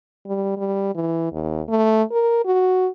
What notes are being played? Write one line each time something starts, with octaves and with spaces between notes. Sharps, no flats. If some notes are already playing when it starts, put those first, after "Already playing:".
G3
G3
E3
D#2
A3
A#4
F#4